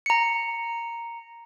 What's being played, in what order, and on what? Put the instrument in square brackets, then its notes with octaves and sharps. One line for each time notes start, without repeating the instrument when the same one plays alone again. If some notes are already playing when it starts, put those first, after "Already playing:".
[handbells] A#5 C#7